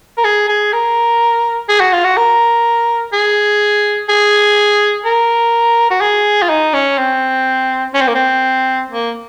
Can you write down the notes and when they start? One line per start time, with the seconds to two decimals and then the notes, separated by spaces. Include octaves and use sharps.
0.18 A#4
0.24 G#4
0.49 G#4
0.73 A#4
1.69 G#4
1.80 F#4
1.93 F4
2.04 F#4
2.17 A#4
3.13 G#4
4.09 G#4
5.05 A#4
5.91 F#4
6.01 G#4
6.43 F4
6.50 D#4
6.74 C#4
6.98 C4
7.94 C#4
8.01 C4
8.08 A#3
8.15 C4
8.91 A#3